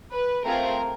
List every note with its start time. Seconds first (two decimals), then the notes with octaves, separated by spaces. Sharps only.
0.12 B4
0.44 A3 C4 F4 G#4 A#4